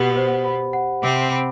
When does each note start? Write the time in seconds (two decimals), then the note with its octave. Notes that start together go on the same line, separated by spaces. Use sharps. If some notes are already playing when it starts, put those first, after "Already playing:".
Already playing: B2 B3 G4 F#5
0.17 C5
0.44 B5
0.73 F#5
1.02 C3 C4 D6
1.32 B5